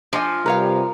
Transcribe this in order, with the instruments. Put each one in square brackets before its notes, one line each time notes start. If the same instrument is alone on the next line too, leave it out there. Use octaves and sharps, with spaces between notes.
[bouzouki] F3 [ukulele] D4 D#5 G#5
[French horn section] C3 G3 [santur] A#4 [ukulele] B4 C#5 F5